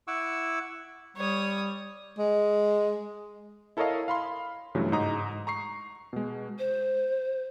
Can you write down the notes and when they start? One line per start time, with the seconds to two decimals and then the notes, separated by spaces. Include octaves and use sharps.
0.08 E4 F#5 C#6 D6 E6
1.17 G3 C#5 D#6
2.18 G#3
3.77 E4 A4 A#4 C#5 D#5 F5
4.08 F5 B5 C6
4.75 G2 C#3 E3 F#3 A3
4.92 G#2 D#4 A#5 D#6
5.47 A#5 C#6 C7
6.13 B2 G#3
6.59 C5